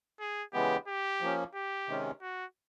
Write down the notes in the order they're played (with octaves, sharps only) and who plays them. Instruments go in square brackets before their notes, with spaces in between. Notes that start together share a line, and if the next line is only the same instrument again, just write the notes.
[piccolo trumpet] G#4
[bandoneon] C#3 E3 G#3 B3 [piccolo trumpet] G4
[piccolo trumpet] G4
[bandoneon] F3 A#3 C#4
[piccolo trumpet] G4
[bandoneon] C3 D#3 G#3 C#4
[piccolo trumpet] F#4